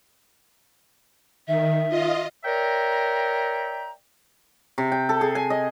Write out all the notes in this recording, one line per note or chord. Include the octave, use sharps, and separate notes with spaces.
D#3 E5
F4 D#5
A#4 C#5 D5 E5 G5 A#5
C3
G5
A4
G#4
G#5
D#5